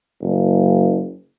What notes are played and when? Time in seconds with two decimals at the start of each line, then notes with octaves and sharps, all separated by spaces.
0.22 F#1